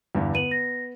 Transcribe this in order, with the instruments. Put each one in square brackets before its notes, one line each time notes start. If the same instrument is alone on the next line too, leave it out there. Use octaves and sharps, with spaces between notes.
[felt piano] E2 G2 D3
[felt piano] B3 [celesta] D#7 F#7
[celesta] A#6